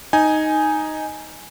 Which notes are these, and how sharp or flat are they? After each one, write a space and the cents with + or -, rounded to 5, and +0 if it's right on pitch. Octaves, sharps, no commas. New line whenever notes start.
D#4 +0 G#5 +0